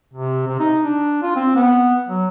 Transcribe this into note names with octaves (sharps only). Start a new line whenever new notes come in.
C3
C3
D#4
D4
F4
C4
B3
F#3